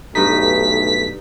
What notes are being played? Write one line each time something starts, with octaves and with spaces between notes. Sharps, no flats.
B1 G2 A3 D#4 B6